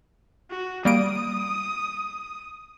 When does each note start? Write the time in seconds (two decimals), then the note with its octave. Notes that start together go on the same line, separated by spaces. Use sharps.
0.50 F#4
0.85 G3 A#3 D#6 D7